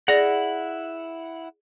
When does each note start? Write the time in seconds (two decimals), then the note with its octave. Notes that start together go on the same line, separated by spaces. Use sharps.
0.08 E4 G#4 D5 F#5 A#6